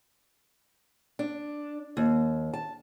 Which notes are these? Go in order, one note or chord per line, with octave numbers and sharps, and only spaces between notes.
D4
D#2
A5